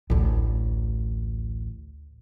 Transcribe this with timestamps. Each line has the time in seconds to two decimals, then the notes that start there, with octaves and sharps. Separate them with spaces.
0.10 A1 D2